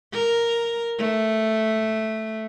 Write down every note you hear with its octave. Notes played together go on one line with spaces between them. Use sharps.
A#4
A3